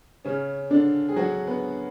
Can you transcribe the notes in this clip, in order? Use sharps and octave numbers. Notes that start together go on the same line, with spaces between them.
C#3 C#4
D3 D4
G#4
F#3 F#4
B3